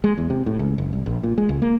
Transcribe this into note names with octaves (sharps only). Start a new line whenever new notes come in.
G#3
E2
C3
A2
C#2
F#1
C2
A#1
A#2
G#3
C#2
A#3